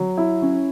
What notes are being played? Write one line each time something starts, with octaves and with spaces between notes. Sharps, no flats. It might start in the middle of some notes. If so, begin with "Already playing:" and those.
Already playing: F#3
E4
C#4